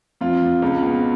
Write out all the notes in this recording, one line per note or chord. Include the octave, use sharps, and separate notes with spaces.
F2 F4
F2
C#2
B2